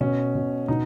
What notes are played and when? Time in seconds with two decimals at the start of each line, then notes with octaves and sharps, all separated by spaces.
0.01 B2 C#4
0.35 B2
0.68 B2 D#4